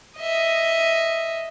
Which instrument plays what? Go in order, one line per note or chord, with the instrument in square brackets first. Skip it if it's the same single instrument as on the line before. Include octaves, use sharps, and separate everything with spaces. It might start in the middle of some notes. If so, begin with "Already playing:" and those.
[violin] D#5 E5